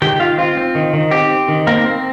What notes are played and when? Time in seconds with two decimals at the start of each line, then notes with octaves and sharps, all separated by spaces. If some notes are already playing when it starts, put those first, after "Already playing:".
0.02 D#3 G4 G5
0.20 D#3 F4 F5
0.38 C4 F4
0.57 C4
0.75 D#3
0.93 D#3
1.11 C4 G4
1.30 C4
1.48 D#3
1.67 A#3 C4 A#4
1.85 C4